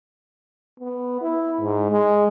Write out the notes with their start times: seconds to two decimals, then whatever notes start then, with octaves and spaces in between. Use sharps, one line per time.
0.80 B3
1.22 E4
1.60 G#2
1.92 G#3